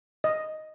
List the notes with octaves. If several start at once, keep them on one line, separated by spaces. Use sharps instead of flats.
D#5